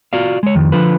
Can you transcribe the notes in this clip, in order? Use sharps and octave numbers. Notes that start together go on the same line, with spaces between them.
F4 F#4 D5 F5
G#3 C#5
F2 D#3
D3 F3 F4 B4